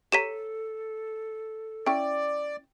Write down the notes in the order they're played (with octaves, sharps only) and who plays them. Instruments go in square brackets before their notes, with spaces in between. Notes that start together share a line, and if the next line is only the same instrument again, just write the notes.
[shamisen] G4 C#5 A#5 [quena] A4 [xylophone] B6 D#7 E7
[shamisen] C#4 E4 [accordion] D5 [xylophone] G5